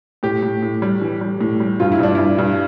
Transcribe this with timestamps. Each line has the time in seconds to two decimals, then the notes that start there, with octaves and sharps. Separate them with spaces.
0.23 A2 G4
0.43 A2
0.63 A2
0.82 G3
1.01 E3
1.21 G3
1.41 A2
1.60 G3
1.80 G2 F4
1.92 E4
1.99 G2 D4
2.15 G2 E4
2.38 G2